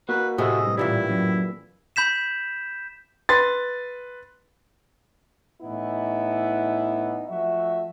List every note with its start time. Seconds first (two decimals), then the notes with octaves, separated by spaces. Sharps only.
0.09 A#3 F#4 B4
0.38 A2 C3 F#4 G#4 D#5 E5
0.66 G2
0.77 A#2 E3 G3 E4
1.10 F#2
1.96 B5 G6 B6 E7
3.29 B4 C6 A6
5.62 A2 E3 B3 D#4 E4
7.29 F3 A3 F#4 E5